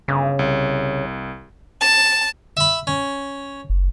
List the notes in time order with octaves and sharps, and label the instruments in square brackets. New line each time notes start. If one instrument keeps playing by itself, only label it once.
[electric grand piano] G1 [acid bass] C#3
[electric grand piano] C2
[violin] A5
[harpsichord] E5 B5
C#4
[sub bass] F#1